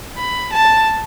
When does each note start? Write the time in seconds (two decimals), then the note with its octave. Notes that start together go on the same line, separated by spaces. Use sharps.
0.17 B5
0.52 A5